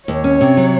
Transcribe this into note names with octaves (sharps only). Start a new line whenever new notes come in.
D#2 C#5
C#4
C3
F#3